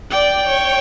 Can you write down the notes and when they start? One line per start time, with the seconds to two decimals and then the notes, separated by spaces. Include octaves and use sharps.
0.10 D5 G5
0.47 C#5